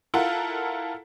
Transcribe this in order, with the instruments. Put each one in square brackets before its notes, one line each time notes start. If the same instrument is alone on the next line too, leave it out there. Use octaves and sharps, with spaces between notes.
[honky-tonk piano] E4 F4 A4 A#4 F#5